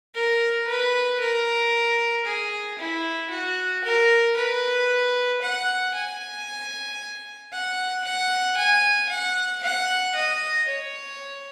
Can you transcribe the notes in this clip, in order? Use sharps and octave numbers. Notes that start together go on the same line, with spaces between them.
A#4
B4
A#4
G#4
E4
F#4
A#4
B4
F#5
G#5
F#5
F#5
G#5
F#5
F#5
D#5
C#5